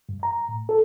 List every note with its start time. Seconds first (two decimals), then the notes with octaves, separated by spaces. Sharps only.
0.09 G2
0.23 A#5
0.49 A2
0.69 A4